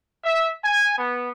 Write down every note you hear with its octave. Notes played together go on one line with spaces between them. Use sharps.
E5
G#5
B3